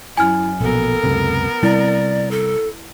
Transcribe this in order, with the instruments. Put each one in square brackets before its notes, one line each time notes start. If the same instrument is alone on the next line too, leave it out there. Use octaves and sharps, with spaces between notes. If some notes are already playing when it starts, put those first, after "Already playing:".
[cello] F#2 [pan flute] E4 [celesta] G#5 F6
[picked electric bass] A#1 B2 [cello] B3 A#4 [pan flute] A4
[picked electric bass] C#2 F#2 C3
[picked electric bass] C3 G3 C4 [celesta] E4 [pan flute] D5
[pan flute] A4